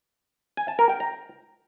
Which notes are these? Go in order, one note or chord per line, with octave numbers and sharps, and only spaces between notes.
G#5
A5
A#4
G5
A#5